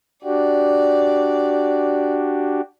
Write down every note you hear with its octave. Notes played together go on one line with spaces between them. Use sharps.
D4 F#4 G4 D5